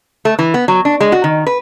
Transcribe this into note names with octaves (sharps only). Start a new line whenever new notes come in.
A3
E3
B3
F#3
D4
G#3
F#4
D#3
B4